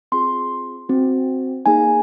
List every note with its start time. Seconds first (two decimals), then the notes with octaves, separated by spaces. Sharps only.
0.12 C4 F4 G#4 C6
0.89 C4 F#4
1.66 A#3 D#4 G#4 G#5